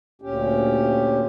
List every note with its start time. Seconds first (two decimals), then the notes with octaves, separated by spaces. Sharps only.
0.22 D2 A#2 C#4 G4